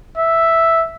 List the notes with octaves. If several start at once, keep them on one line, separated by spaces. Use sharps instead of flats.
E5